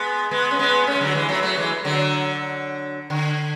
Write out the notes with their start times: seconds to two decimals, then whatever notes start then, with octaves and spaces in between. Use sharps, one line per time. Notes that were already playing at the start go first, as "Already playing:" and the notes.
Already playing: G#3 B3
0.31 G#3 B3
0.51 C#4
0.59 G#3 B3
0.87 A3 C#4
0.95 G#3
1.01 D3 F#3
1.15 E3 G#3
1.29 F#3 A3
1.43 F#3 A3
1.57 E3 G#3
1.85 D3 F#3
3.10 D3